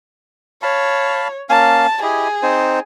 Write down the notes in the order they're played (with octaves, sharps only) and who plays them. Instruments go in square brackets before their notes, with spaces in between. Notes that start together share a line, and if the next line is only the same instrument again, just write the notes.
[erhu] C#5 [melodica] F5 A5 B5
[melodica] A#3 C#4 F5 [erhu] A5
[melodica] E4 G4 D#5 [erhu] G#4
[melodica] C4 D#4 C5